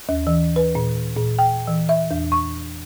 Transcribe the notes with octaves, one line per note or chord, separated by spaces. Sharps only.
D#2
E3
B4
A#2
A#2
G5
E3
E5
E2
C#6